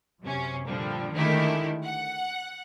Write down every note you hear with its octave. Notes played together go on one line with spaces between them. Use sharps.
F#2 C3 C#4
A#2 D3 F3 G3
D3 D#3 G#3 A3 E4 G4
F#5